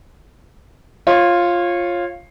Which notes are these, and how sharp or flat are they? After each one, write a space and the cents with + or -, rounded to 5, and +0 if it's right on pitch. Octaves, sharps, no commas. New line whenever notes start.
F4 +0 C#5 -25